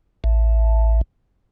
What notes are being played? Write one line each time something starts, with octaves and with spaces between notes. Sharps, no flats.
A1